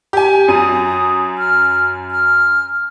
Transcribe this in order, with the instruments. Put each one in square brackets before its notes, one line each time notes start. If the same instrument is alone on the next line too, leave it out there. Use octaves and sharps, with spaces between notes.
[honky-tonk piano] G4 G#5
[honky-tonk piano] F#2 D#7 [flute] D#6
[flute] F6
F6